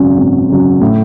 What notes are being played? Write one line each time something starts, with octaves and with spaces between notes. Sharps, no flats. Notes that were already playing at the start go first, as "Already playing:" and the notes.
Already playing: G#1 F#2 C#3 F#3
G#1
F#2 C#3 F#3
A2